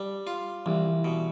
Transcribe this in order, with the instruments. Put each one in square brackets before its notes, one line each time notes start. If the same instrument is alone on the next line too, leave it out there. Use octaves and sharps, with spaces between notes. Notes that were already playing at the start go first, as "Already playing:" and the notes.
Already playing: [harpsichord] G3 D4
F4
[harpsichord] C2 [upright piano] E3
[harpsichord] B2